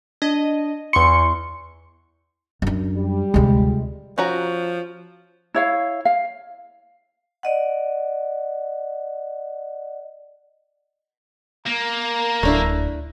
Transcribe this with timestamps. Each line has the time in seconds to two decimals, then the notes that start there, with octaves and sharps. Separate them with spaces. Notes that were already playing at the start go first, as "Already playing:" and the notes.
0.22 D4 D#5
0.93 E2 C6 C#6 C#7
2.62 F#2 D4
2.95 G3
3.34 D2 C3 G#3 F4
4.18 F3 C#4 F#4 A#5
5.54 E4 C#5 F5
6.05 F5
7.43 D5 D#5 F#5
11.66 A#3 A#5
12.43 D1 A3 D4 E4